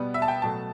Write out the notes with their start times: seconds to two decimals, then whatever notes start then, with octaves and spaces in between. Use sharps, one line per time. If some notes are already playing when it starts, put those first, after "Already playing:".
Already playing: B2 G3 B3
0.14 E5
0.22 A5
0.28 G5
0.42 B2 F#3 A3 A5